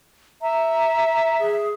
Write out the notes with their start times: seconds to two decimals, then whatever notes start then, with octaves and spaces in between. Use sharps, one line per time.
0.42 E5 A#5
1.39 G#4